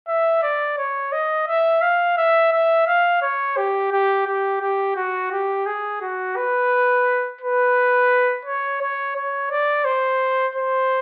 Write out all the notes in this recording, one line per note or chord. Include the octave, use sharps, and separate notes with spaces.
E5
D5
C#5
D#5
E5
F5
E5
E5
F5
C#5
G4
G4
G4
G4
F#4
G4
G#4
F#4
B4
B4
C#5
C#5
C#5
D5
C5
C5